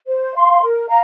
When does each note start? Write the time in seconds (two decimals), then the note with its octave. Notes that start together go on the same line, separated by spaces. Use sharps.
0.07 C5
0.34 F5 C6
0.61 A#4
0.88 F5 A#5